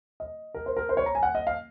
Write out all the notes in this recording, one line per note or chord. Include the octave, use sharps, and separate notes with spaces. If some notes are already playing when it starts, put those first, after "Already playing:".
D#5
A#4
C5
A#4
C5
C#5
A#5
G#5
F#5
D#5
F5